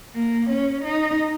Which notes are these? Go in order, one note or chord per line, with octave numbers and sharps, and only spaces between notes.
A#3
C#4
D#4